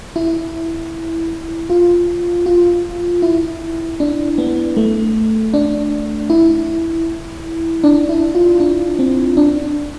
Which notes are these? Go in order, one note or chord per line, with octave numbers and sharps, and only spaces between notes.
E4
F4
F4
E4
D4
B3
A3
D4
E4
D4
E4
F4
D4
C4
D4